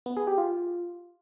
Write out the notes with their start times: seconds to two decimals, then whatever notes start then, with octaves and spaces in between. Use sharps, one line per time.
0.06 B3
0.17 G#4
0.27 G4
0.38 F4